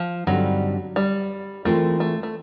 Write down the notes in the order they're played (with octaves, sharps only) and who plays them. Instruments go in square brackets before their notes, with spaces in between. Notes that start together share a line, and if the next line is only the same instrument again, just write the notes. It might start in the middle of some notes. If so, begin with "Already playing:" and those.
Already playing: [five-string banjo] F3
[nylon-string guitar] G2 D3 G3 C4 D#4 [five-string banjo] F#3
[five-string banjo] G3
[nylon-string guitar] E3 G#3 C4 F4 A#4 [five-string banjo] A3
[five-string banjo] A3
A3